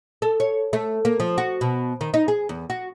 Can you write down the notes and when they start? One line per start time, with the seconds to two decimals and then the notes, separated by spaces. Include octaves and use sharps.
0.22 A4
0.40 C#5
0.73 A3
1.05 A#3
1.20 F3
1.38 F#4
1.61 B2
2.01 D#3
2.14 D#4
2.28 G#4
2.49 E2
2.70 F#4